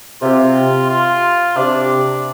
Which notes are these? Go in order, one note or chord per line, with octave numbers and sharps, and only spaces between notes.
C3 F4
F4
C3 D4